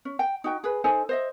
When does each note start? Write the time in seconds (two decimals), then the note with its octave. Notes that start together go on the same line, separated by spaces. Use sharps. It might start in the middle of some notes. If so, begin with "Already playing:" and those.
0.05 C#4
0.19 G5
0.44 D#4 F#4 G5
0.64 G#4 B4
0.84 D#4 A4 C5 G#5
1.09 C5 D#5 E5